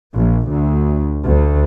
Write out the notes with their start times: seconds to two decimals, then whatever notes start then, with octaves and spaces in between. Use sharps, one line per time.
0.13 A#1
0.49 D2
1.26 D2